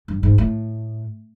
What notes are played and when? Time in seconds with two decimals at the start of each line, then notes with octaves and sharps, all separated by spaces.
0.08 G2
0.23 G#2
0.38 A2